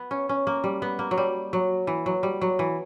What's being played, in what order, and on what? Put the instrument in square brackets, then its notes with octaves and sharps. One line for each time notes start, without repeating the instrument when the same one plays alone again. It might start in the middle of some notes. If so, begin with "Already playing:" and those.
Already playing: [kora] B3
C#4
C#4
A#3
G3
B3
A#3
F#3
G3
F#3
E3
F#3
G3
F#3
E3